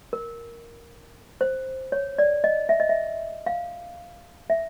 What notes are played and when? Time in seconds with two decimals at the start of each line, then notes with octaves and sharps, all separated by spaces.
0.13 A#4
1.41 C5
1.92 C#5
2.18 D5
2.44 D#5
2.69 E5
2.80 D#5
2.89 E5
3.46 F5
4.50 E5